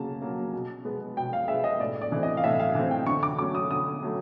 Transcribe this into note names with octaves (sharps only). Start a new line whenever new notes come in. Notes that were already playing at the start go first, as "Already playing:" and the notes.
Already playing: C#3 F#3 A#3 A5
F#3 A#3
B2
G#3 B3
B2 G5
F5
G#3 B3 E5
D#5
A2 D5
D5
E3 A3 C4
D#5
F5
A2 E5
F5
E3 A3 C4
G5
D3 C#6
D6
F#3 A3 C#4 D6
D#6
D3 D#6
F#3 A3